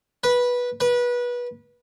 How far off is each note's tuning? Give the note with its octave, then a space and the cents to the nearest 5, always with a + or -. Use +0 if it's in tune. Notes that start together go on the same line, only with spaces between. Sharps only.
B4 -15
B4 -25